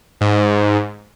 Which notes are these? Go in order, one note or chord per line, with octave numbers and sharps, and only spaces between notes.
G#2